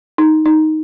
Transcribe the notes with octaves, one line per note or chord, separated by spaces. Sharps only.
D#4
D#4